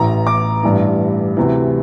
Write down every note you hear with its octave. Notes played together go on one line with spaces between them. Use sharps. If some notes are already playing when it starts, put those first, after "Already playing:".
Already playing: A1 A2 E3 A#5
D6
A1 G2 E3
D2 C3 E3